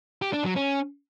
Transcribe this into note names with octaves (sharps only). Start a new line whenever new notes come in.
G4
D4
F#3
C#4